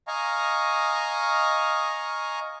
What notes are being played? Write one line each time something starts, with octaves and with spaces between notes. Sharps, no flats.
D#5 F5 G#5 A#5 C#6